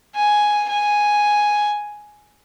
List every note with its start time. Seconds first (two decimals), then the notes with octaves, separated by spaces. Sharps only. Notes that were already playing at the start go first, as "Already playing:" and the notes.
0.15 G#5
0.69 G#5